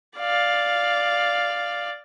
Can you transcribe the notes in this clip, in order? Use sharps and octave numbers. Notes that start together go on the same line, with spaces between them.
D5 F5